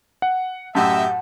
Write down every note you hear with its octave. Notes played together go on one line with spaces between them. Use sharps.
F#5
F#2 A2 G4 D#5 E5 F#5 A5